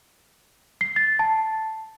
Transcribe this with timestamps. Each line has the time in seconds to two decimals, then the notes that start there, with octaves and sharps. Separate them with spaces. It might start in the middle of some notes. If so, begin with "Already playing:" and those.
0.81 C7
0.96 A6
1.19 A5